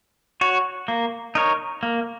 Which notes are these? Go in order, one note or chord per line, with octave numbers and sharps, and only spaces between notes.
F#4 C#5
A#3
D#4 A#4 C#5
A#3